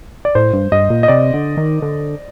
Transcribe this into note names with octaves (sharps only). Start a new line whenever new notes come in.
D5
A2 C5
G2
G2 D#5
A#2
D#5
C3 D5
D3
D#3
D3